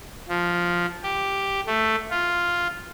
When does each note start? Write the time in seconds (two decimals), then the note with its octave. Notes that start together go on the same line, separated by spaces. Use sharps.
0.28 F3
1.03 G4
1.67 A3
2.10 F4